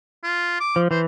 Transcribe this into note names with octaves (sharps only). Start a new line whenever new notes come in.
F4
D6
F3
E3 C5